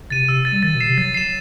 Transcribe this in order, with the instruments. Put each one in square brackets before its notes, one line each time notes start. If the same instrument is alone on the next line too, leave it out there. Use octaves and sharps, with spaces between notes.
[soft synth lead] C3 [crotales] A6 D#7
[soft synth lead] C3 [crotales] E6
[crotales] A6 D#7
[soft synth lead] G3
[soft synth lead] D#3 [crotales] A6
[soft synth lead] B2
[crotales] C7 E7
[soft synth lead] C3
[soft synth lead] F#3 [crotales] A6
[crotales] C7 E7